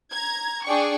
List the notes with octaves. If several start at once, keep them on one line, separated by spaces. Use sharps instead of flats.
A#5 G#6
D4 G#4 D5 G5 C#6